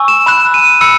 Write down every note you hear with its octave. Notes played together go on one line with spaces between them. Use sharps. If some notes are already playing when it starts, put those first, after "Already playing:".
Already playing: G#5 C#6 E6
E7
B5 F#6 E7
D#7
B5 E6 C#7